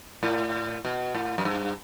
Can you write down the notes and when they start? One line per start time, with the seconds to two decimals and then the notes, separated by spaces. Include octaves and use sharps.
0.23 A2
0.85 B2
1.15 A2
1.38 F#2
1.45 G2